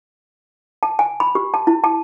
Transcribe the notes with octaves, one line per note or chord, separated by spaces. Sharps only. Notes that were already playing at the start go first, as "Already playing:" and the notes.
A5
G#5
B5
G4
A5
E4
A5